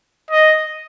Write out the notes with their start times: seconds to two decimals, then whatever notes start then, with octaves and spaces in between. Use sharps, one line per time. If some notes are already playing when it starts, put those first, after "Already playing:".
0.31 D#5